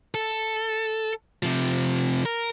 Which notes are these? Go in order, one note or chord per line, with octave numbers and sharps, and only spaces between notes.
A4
C3 F3
A#4